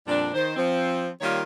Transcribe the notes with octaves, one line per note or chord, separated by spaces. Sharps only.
F2 A#2 G3 D4
D#3 C5
F3 C4
D#3 G3 A#3 F4 G4 C#5